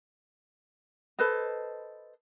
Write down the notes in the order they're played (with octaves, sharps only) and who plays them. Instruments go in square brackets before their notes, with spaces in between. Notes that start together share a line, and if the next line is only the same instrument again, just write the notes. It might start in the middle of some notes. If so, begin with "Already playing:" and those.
[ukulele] A4 B4 C5 D#5